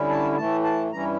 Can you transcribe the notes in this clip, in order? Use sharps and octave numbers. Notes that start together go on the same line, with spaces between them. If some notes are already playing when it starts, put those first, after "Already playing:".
Already playing: D3 G3 C#4 E4
A5
A2 E3 A3 A5
A5
G2 E3 G3 C#4 E4 A#5